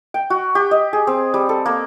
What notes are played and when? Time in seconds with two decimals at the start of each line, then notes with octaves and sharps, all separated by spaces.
0.14 G5
0.30 F#4
0.55 G4
0.71 D#5
0.93 G#4
1.07 C4
1.34 G3
1.49 A4
1.66 A#3